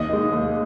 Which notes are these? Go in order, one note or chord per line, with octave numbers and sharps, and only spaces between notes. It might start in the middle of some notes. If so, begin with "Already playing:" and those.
Already playing: D#2 D#5
D#3 G#3
D#2